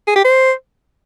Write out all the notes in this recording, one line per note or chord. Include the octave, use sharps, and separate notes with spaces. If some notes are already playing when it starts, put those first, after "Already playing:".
G#4
G4
C5